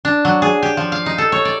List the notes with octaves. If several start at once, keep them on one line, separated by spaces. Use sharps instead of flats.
D4
F#3
G#4
G4
F3
F5
D#4
A4
C#5
D5